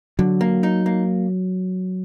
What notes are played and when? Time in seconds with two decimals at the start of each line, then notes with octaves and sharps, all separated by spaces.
0.19 D3 F#3
0.41 A#3
0.63 D#4
0.86 A#3